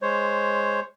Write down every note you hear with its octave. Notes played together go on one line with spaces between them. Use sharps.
G#3 C5 C#5